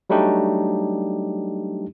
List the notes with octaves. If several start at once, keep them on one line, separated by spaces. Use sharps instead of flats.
F#3 G3 A3 D4 D#4 G4